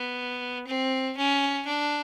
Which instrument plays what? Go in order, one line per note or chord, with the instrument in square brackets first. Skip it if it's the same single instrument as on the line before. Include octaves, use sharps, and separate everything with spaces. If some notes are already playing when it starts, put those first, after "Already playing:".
Already playing: [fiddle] B3
C4
C#4
D4